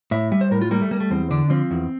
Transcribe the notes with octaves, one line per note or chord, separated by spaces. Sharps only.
A2 E5
G3 E5
C5
A2 A#4
F4
G3 A#3
A3
G3 A#3
A3
E2 C4
D3 D4
F3 C4
E2